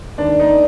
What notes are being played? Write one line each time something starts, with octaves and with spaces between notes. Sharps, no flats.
D#2 D4
D#3 D#4